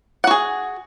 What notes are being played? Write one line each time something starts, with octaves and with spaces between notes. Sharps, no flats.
F#4 G#4 F#5